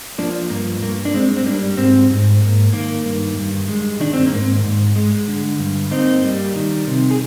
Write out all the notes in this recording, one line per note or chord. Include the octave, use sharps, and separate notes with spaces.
F3 A#3 D4
G2 A#3
G2 A#3
D4
G#3 C4
C4
G3 A#3 D4
G#2 C4
G#2
A#3
D#3 A#3
G2
G2
G#3
D#3 D4
C4
A#3
G#2
C4
G#2
G#3
D3
G2
A#3 C4 D#4
G3
D#3
C3
G#4